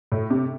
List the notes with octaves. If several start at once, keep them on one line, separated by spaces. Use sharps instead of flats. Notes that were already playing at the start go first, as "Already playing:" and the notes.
A2
C3